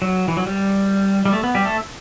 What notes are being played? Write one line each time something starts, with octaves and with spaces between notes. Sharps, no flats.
F#3
E3
F#3
G3
G3
A3
B3
G3 G4
A3 A4